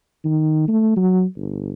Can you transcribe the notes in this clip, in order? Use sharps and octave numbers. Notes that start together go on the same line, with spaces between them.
D#3
A3
F#3
G1